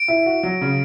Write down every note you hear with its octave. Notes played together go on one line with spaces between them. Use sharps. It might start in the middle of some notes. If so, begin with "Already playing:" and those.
Already playing: D7
E4
F#4
F#3
C#3